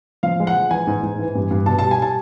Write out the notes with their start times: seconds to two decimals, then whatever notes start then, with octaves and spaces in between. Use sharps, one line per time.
0.23 F3 F5
0.40 G#3
0.47 F#5
0.56 F3
0.71 E3 G#5
0.87 G#2
1.03 G#2
1.19 E3
1.35 G2
1.51 G2
1.66 B2 A5
1.79 G3 A5
1.91 G#5
1.98 G3 A5